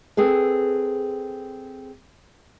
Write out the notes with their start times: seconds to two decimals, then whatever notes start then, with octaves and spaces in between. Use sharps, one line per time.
0.17 C4 G#4 A4 B4